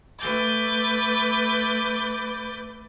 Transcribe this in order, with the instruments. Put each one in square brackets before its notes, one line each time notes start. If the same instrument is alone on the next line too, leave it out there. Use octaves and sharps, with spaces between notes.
[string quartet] A3 B4 D6 G6 A6